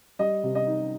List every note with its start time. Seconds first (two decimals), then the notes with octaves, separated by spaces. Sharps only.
0.19 G3 D#5
0.44 C3
0.55 D#5
0.67 D#4